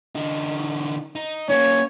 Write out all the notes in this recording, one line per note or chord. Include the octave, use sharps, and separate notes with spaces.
D3 D#4
D#4
A#3 C#4 C#5